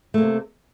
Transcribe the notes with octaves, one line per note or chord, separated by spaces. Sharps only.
C3 A3 A#3